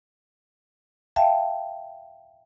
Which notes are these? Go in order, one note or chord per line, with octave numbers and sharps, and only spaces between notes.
E5 F5 G5 A5